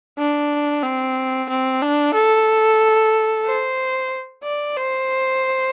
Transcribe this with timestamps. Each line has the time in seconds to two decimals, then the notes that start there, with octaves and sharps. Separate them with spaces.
0.18 D4
0.82 C4
1.49 C4
1.81 D4
2.14 A4
3.45 C5
4.44 D5
4.76 C5